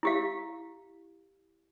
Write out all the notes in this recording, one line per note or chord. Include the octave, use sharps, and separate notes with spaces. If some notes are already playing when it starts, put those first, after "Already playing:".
E4 G4 F5